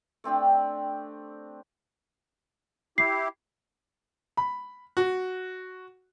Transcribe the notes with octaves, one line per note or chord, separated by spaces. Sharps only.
A3 C4 D4 G4
E4 G4 C7
B5
F#4